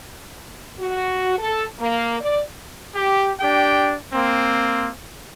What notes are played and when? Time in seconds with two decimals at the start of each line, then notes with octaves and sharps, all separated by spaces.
0.79 F#4
1.38 A4
1.79 A#3
2.21 D5
2.94 G4
3.40 D4 G4 G5
4.13 A#3 C4